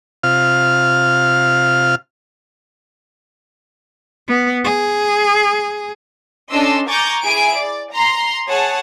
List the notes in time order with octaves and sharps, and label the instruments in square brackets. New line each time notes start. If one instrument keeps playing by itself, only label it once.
[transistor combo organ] C3 F4 F5 F6
[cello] B3
G#4
[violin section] C#4 D4 A4 D#5 C6 E6
G#5 A#5 C#6 D6 G6 A6
E4 G#4 G#5 D7
D5
A#5 C6
G#4 C#5 F#5 A5